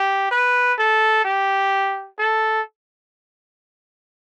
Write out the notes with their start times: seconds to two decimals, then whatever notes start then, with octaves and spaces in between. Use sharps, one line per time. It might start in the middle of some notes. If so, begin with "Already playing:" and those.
Already playing: G4
0.31 B4
0.78 A4
1.24 G4
2.18 A4